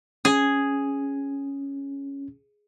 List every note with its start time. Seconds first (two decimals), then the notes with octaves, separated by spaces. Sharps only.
0.25 C#4 G#4